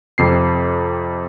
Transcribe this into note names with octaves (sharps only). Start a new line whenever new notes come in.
F2 C3 C7